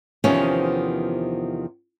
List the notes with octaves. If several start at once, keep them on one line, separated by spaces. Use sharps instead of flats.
E2 C3 D#3 F3 B3 C#4